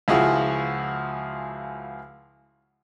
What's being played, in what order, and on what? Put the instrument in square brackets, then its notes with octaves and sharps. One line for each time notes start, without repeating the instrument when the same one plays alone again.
[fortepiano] C#2 F3 E4 F#4 G#4